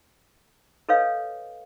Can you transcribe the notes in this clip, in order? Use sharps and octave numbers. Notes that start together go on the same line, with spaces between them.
A4 B4 C#5 D#5 F5